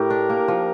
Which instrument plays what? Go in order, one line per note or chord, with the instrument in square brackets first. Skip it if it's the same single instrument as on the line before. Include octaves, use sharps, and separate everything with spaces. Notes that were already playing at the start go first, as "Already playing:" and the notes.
Already playing: [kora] A2 [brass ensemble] G4 A#4
[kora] D4
A#3
F3